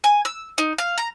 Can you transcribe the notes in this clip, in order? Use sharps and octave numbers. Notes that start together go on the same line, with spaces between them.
G#5
E6
D#4
F5
A#5